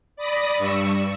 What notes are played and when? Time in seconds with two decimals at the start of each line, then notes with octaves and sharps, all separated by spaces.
0.16 D5 B5 D#6 A#6
0.58 G2 C#6 E6